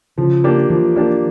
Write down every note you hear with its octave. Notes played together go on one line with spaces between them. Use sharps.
C#3 F3
A#3 D4 G4
E3 F3
A#3 D4 G4